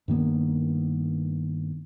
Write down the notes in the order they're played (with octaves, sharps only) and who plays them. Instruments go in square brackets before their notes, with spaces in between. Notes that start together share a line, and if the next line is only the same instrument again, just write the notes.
[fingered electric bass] G2 D#3 A#3 B3